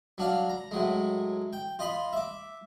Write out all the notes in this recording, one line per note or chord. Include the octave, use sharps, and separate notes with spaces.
F#3 D4 F5
A#5
A2 F#3 G#3
G5
F4 D#5 B5 C6
E5 D6